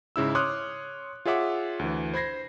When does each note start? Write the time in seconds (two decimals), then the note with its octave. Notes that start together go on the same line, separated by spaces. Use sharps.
0.16 G#2 C#3 E4 E6
0.35 C#5 C6 D6 D#6 F6 F#6
1.25 F4 G#4 C#5 E5 F#5 D6
1.79 D2 E3
2.14 C5 B5 G#6 A#6 C7